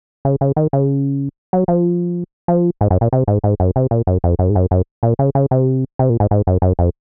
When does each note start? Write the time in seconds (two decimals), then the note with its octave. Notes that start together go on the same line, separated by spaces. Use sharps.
0.25 C#3
0.41 C#3
0.56 D#3
0.73 C#3
1.53 F#3
1.68 F3
2.48 F3
2.81 G#2
2.91 F#2
3.01 A#2
3.13 C3
3.28 G#2
3.44 G#2
3.60 F#2
3.76 C3
3.91 A#2
4.07 F#2
4.24 F2
4.39 F#2
4.50 G#2
4.55 F#2
4.71 F#2
5.03 A#2
5.19 C#3
5.35 C#3
5.51 C3
5.99 C3
6.10 A#2
6.20 G#2
6.31 G#2
6.47 F#2
6.62 F#2
6.79 F2